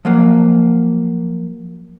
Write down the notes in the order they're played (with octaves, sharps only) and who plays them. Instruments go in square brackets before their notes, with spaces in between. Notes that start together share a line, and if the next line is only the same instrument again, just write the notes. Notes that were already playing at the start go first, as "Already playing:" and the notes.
[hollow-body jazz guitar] F3 F#3 A#3